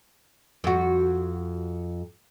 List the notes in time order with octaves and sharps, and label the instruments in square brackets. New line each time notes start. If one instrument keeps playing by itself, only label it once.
[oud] F2 F#4